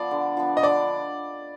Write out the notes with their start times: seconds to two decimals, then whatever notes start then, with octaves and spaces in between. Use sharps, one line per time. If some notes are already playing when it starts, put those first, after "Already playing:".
Already playing: F3 B3 D5
0.11 D3
0.37 F3 B3
0.57 D#5
0.63 D3 D5